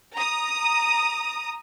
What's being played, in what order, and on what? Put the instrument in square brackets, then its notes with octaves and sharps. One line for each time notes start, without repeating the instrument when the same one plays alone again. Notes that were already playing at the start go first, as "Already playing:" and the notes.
[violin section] A#5 D#6